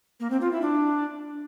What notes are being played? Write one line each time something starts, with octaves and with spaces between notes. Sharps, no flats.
A#3
C4
F4
E4
D4